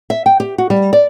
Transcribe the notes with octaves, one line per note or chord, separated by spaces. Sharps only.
E5
G5
G4
F#4
G3
D5